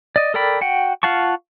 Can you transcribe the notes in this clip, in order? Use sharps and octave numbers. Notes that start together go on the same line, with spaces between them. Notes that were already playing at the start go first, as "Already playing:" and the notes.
D5 D#5
A4 A#4 D5 G5 B5
F#4 F#5 G5
F4 F5 F#5 A5 C#6